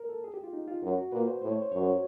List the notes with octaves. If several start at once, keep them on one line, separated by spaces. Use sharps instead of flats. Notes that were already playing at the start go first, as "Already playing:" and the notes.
Already playing: A#4
A4
G#4
G4
F4
D#4
F4
F#2 F#4
F#4
A#2 B4
C5
A2 C5
C#5
C5
F#2 C#5
F#4